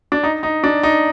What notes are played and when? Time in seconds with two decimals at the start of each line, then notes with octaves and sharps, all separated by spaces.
0.12 D4
0.23 D#4
0.43 D#4
0.64 D4
0.83 D#4